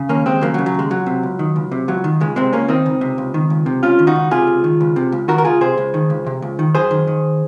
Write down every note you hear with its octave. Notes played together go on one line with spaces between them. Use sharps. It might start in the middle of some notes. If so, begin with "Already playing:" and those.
Already playing: C#3
D#2 A#3 C#4
D#2 G#3 C4
C#3 F#3 A#3
F#3
C#3
F#3
D#2 G#3
C#2 F#3
C3
C#2
D#3
C#2
C3
C#2 F#3
D#3
C#2 G#3
C3 G#3 C4
C#2 A#3 C#4
D#3 C4 D#4
C#2
C3
C#2
D#3
C#2
C3
C#2 C#4 F4
D#3
D#4 F#4
C#2
C3 F4 G#4
C#2
D#3
C#2
C3
C#2
D#3 F#4 A#4
A#4
C#2 F4 G#4
C3 G#4 C5
C#2
D#3
C#2
C3
C#2
D#3
F#2 G#4 C5
D#3
D#3